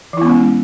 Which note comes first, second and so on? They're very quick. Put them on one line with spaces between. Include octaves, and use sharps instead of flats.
E3 E4 B3 C#4 G#3